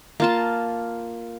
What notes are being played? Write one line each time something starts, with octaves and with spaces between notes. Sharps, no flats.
A#3 F4 A5